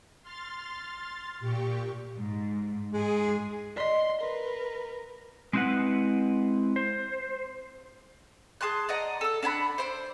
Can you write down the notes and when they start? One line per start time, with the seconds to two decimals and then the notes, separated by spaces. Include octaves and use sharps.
0.22 C6 F6 A6
1.40 A#2 G4 C#6
2.17 G#2
2.93 G#2 G#3 G#4
3.77 D5 D#5 C6
4.21 A#4 B4
5.53 G#3 C4 E4 F#4 B4 F#5
6.76 C5
8.61 G#4 A5 C6 F#6
8.89 D5 D#5 F#5 A#5
9.21 A4 E6
9.43 D4 F#5 G#5 B5
9.78 C5 D5